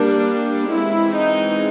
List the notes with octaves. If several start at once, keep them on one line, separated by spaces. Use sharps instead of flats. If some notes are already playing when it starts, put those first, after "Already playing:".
Already playing: G3 A#3 D4
E3 G#3 C4 E4
D#4